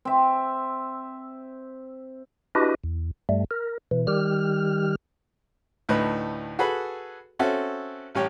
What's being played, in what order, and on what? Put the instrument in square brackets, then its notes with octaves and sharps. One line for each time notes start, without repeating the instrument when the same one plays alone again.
[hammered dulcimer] C4 E5
[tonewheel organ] D4 E4 F#4 G4 B4 D#5
E2
G2 G3 A3
A#4
B2 E3
D#3 G3 G4 F6
[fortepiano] D2 A2 D#4 B4
F#4 G#4 A4 B4 B5
C4 C#4 F#4 A4 E5
A1 G3 C#5 G5